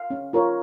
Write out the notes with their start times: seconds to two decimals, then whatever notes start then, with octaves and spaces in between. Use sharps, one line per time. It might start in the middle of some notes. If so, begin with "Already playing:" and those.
Already playing: F5
0.10 C#4
0.33 F4 A#4 C#5